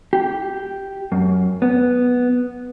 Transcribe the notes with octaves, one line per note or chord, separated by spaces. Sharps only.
G4
F#2
B3